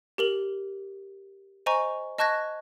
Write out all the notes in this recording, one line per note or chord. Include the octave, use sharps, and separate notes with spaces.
G4 A#4 F#7
C5 D#5 G#5 A#5 C#6
D#5 A5 C#6 F#6 G#6 A#6